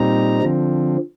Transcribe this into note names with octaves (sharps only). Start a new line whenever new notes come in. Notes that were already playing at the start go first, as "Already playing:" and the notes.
Already playing: A#2 G3 C4 D#4 A#5
D3 F3 C4